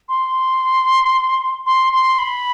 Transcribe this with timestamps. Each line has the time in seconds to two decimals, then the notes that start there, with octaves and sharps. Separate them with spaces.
0.09 C6
1.66 C6
1.93 C6
2.19 B5